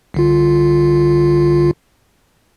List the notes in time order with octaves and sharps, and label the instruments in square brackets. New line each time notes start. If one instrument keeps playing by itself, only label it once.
[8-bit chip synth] C2 D3 F4